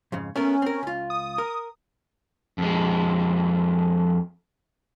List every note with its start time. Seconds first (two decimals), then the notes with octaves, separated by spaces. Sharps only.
0.12 F2 G#2 C#3
0.36 A3 B3 C#4 A#4
0.62 C4 A#4
0.83 C#2 F4
1.10 D#6
1.38 A#4
2.58 F2 G#3